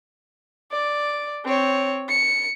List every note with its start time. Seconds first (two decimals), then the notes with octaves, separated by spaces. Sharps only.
0.72 D5
1.45 C4 C#5
2.09 C#7